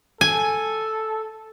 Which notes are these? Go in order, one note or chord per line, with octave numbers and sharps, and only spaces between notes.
A4 G#5